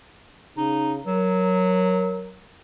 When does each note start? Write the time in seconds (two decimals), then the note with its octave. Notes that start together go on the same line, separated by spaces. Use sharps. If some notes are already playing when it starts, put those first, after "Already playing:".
0.57 C#3 D#4
1.06 F#3 A#4